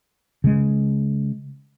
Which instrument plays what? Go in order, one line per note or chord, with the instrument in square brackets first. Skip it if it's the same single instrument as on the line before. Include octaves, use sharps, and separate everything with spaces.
[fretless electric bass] C#3 G#3